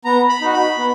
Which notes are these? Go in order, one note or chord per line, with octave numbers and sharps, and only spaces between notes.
B3 A#5
B5
D#4 F#4
B5
B3